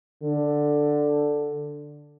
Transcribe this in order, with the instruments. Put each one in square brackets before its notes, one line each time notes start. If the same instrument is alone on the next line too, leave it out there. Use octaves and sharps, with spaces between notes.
[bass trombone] D3